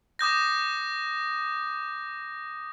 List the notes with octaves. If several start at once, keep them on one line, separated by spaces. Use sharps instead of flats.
D6 D#6 G6 A#6